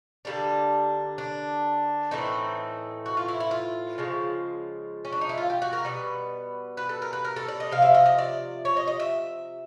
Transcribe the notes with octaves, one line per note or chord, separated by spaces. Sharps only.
D3 G3 A#3 D4
D4
A2 E3 A3 C4 D#4
F#4
F4
E4
E4
F4
C#3 F3 G#3
C#4
D4
D#4
E4
F4
G4
F#4
A#4
B2 G3 B3 B4
B4
A4
A#4
B4
A#4
A4
D5
D#5
C3 F3 F5
E5
D#5
D#5
D5
C#5
D#5
D#5
E5